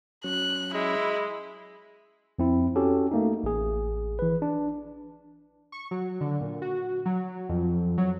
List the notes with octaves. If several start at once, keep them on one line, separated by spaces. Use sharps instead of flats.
F#3 C#4 F#6
G#3 E4
F2 C4 E4
C#4 F#4 G4 A4
A3 A#3 D#4
A1 G#4
E3 B4
D4
C#6
F#3
D3
A#2
F#4
F#3
F2
F#3